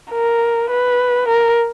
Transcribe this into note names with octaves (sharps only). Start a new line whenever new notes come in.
A#4
B4
A#4